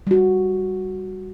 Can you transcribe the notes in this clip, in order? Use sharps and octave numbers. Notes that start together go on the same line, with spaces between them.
G3 F#4